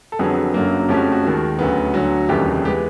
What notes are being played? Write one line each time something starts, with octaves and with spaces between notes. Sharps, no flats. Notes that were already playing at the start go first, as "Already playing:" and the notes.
A4
F2 D3 F#3 B3 G#4
F#1 F#2 D3 F#3 A#3
F2 C#3 F3 A3 C#4 G4
F#4
F#4
D#2 D#3 G#3
D2 C#3 F#3 B3
D2 D3 F#3
F1 D#2 C#3 E3 G3 G4
E3 G#3 B3 G4